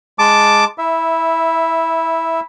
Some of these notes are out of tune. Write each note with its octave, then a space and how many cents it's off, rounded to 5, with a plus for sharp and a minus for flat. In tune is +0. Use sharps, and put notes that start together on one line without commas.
G#3 +0 A5 +0 D6 +0
E4 -15 E5 +0